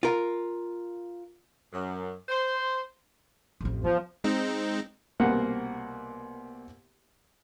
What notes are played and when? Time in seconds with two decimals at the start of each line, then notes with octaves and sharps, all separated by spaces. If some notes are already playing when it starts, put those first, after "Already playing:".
0.03 F4 A#4
1.72 F#2
2.29 C5
3.61 A1 F2
3.84 F3 B3
4.24 G#3 C4 D#4
5.20 C2 B2 A#3 F#5